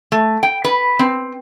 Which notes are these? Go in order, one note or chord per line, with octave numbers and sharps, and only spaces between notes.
A3
G5
B4
C4